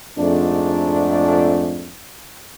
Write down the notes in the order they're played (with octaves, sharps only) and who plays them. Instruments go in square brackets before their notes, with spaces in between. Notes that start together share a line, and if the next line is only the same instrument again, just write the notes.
[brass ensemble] F2 G#2 A3 D4